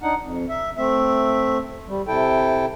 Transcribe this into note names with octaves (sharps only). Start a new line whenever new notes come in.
D4 D#4 F#5
F2
E5
A3 C4 E5
G3
C3 E4 A4 G5